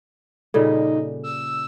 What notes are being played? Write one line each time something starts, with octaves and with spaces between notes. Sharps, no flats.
A#2 C#3 G3 D#4 A4
E6